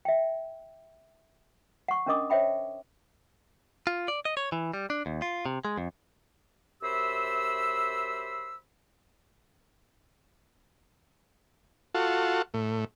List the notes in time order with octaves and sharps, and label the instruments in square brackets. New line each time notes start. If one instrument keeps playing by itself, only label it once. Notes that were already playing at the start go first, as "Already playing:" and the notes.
[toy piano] E5 G5
F#5 C#6
C#4 D4 A#4 D#5 D6 D#6
C5 C#5 E5 G5 B5
[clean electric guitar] F4
D5
D#5
C#5
E3
G3
D4
D#2
F4
C3
G#3
F2
[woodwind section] F#2 G4 C5 E5 B5 E6
[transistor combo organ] F4 F#4 A4
A2